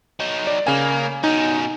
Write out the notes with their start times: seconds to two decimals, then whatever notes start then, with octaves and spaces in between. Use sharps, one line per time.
0.20 F#3 D#4
0.47 D5
0.67 C#3 A#3 G#5
1.24 B2 C#4 D#4